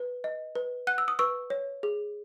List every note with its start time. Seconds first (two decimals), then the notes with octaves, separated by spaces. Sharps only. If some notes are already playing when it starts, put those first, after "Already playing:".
Already playing: B4
0.24 D#5
0.55 B4
0.87 F#5 F#6
0.98 E6
1.08 D#6
1.19 B4 C#6 E6
1.50 C#5
1.83 G#4